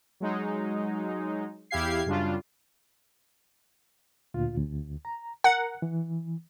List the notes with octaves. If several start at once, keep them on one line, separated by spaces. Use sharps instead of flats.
F#3 G#3 D#4
E2 E4 G4 F5 G#6 C7
F#2 C#3 G3 D4 F4
D2 A#2 F4
D2
A#5
A#4 F#5 A#5
E3